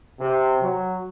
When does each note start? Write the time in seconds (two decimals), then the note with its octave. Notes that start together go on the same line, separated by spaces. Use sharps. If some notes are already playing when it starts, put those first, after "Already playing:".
0.20 C3
0.62 F#3